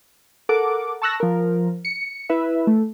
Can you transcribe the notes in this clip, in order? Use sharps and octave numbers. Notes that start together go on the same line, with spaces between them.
A4 A#4 F#5 D6
A5 C#6 E6 F#6 A#6
F3 A#4
C#7
E4 B4 E5
A3